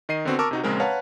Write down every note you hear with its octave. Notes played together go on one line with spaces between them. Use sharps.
D#3 D#5 C7 D#7
D3 B3 C4 F#4
A#4 A5 C#6 D6 E6
C3 D#4 F#4
A#1 C#3 G#3 C4 A#4
B4 C#5 F5 F#5 A5 A#5